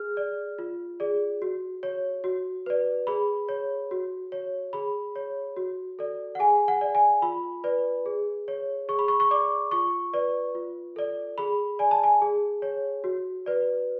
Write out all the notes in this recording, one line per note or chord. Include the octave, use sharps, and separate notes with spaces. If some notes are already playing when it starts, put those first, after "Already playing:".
Already playing: G#4 F6
D5
F4
G#4 D5
F#4
C#5
F#4
B4 D5
G#4 B5
C#5
F#4
C#5
G#4 B5
C#5
F#4
A4 D5
F#5
G#4 G#5
F#5
D5
G#5
F4 B5
B4 D5
G#4
C#5
G#4 C#6
B5
C#6
C#6
D5 D6
F4 C#6
B4 D5
F4
A4 D5
G#4 B5
D5 G#5
A5
G#5
G#4
C#5
F#4
B4 D5